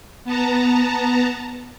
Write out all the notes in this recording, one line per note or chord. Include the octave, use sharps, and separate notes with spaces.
B3 A5 A#5